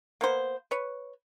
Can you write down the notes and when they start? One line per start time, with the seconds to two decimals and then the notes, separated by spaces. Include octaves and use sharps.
0.21 A#3 B3 C5
0.71 B4 C#5